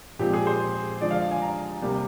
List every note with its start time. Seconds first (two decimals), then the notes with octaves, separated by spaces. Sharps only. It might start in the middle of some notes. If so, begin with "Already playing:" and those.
0.19 A#2 F3 G#3 C4 G4
0.33 G#4
0.47 C5
1.01 D3 F3 G#3 D5
1.11 F5
1.22 F5
1.31 G#5
1.42 A#5
1.82 C3 G3 A#3